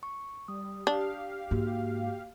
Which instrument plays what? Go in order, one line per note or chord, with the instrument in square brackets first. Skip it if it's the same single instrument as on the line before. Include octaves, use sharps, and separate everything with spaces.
[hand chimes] C#6
[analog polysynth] G3 [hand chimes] D#6
[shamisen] D4 [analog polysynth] G4 F5
[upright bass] G#2 [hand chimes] A#3 F#4